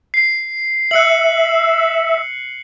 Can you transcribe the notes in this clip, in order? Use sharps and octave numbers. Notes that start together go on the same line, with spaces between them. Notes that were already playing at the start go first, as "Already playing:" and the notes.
C7
E5 F#6 C#7 F#7